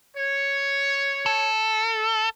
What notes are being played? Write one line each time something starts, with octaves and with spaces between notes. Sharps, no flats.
C#5
A4